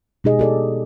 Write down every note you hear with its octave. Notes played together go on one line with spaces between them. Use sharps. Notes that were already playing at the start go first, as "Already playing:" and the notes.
B2 G#3 D#4 G4 G#4 D#5
G4 A4 D5